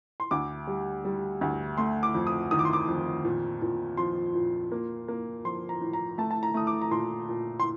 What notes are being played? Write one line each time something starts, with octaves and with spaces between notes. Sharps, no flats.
C6
D2 D6
G3
G3
D2
A3 C6
D6
F2
D#6
D#3 D#6
D6
C6
D6
F2
A#2
A#2
F3 C6
A#2
A#3
A#3
F3 C6
A#5
A2
A#5
A3 A5
A5
A#5
A3 D#6
D6
A#5
A#2 C6
A#2
C6